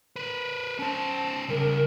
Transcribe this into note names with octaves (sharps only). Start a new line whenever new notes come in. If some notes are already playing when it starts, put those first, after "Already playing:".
A#4 B4
C#4 C5 A5
C#3 G3 A#4